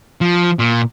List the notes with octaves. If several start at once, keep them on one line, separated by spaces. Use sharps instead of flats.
F3
A#2